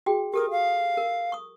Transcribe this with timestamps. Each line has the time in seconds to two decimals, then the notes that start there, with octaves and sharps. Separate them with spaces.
0.06 F#4 G#4 G5
0.34 G4 A4 A#4 D#6
0.51 F5
0.97 A#4
1.32 C#6 D#6